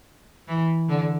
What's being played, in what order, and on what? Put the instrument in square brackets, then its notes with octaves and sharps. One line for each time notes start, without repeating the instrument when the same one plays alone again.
[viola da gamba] E3
D3